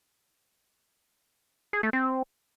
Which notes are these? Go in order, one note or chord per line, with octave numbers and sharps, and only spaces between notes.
G#4
A3
C4